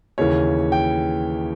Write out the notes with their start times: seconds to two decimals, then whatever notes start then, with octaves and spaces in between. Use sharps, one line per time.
0.18 D#2 C#3 E3 C#5
0.72 G5